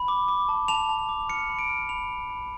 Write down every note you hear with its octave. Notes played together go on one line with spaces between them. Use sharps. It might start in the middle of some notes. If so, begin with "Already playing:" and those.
Already playing: B5
D6
D6
A5
A5 F7
A5
D6
F6 C#7
B5
D7
F6
B5 F7
B5
B5